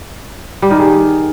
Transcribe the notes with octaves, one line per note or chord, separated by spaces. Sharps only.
G3
D#3
G#4